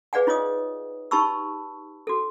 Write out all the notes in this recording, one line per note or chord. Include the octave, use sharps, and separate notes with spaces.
G#4 B4 D5 F5 F#5 G#5
D#4 F4 C#5 D#5 D#6
D#4 G4 A5 B5 C#6 E6
F#4 A4